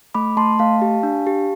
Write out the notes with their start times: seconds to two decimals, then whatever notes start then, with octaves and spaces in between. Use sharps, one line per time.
0.15 A3 B5 D6
0.37 A3 A5 C6
0.59 A3 F5 A5
0.82 G4
1.03 D4
1.27 G4